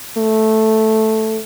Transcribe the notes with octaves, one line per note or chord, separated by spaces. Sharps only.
A3